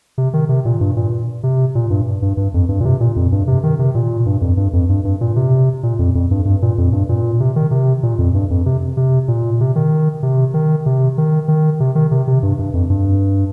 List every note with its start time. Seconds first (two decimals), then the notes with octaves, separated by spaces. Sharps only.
0.18 C3
0.34 D#3
0.49 C3
0.65 A#2
0.80 G2
0.97 A#2
1.43 C3
1.75 A#2
1.90 G2
2.22 G2
2.37 G2
2.54 F2
2.69 G2
2.80 A#2
2.85 C3
3.00 A#2
3.16 F2
3.32 G2
3.47 C3
3.63 D#3
3.79 C3
3.95 A#2
4.26 G2
4.41 F2
4.57 G2
4.73 F2
4.89 G2
5.04 G2
5.21 A#2
5.36 C3
5.83 A#2
5.99 F2
6.15 F2
6.31 G2
6.45 G2
6.62 A#2
6.78 F2
6.93 G2
7.09 A#2
7.40 C3
7.56 D#3
7.71 C3
8.03 A#2
8.18 F2
8.34 G2
8.50 F2
8.66 C3
8.97 C3
9.28 A#2
9.61 C3
9.76 D#3
10.23 C3
10.54 D#3
10.86 C3
11.18 D#3
11.48 D#3
11.80 C3
11.95 D#3
12.11 C3
12.27 C3
12.43 G2
12.59 G2
12.74 F2
12.90 G2